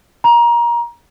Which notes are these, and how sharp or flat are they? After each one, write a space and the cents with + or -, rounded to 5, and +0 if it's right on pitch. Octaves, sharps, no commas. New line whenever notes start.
A#5 +20